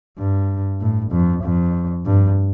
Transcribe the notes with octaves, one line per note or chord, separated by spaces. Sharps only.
G2
A2
F2
F2
G2